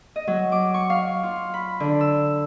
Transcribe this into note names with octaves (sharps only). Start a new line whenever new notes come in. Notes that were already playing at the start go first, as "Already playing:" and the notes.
D#5
F#3
D6
C#6
F5
F4
B5
D3
E6